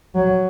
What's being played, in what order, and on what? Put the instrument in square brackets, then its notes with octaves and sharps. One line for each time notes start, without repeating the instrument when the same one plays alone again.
[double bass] F#3